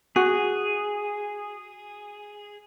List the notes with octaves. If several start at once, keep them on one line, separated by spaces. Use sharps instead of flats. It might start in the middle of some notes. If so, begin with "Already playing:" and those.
F#4 G#4